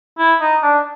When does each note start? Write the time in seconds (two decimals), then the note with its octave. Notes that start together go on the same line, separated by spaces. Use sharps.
0.18 E4
0.40 D#4
0.62 D4